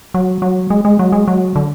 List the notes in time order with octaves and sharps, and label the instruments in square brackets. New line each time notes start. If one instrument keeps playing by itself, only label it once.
[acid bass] F#3
F#3
G#3
G#3
F#3
G#3
F#3
D3